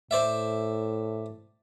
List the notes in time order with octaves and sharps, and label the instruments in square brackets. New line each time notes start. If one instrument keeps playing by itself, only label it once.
[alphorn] A2 [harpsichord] C5 D5 E5